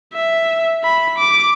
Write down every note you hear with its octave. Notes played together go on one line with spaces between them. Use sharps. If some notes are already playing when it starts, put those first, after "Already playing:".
E5
B5
D6